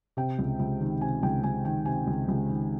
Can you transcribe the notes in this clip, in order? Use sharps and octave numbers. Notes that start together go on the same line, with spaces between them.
C3 G5
C#2
C#2
D#3
C3 G#5
C#2 G5
C#2 G#5
D#3 G5
C3 G#5
C#2
C#2
D#3